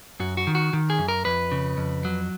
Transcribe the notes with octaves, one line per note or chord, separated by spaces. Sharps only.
F#2 F#4
F#4
D#3
F#4
D#3
G#4
F#2
A#4
F2 B4
C#3
F2
F#3